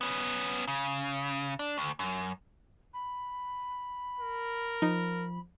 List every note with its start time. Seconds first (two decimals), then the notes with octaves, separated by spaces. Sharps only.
0.01 B3 C#4
0.68 C#3
1.59 D4
1.78 D2
1.99 F#2
2.93 B5
4.20 A#4
4.82 F3 D#4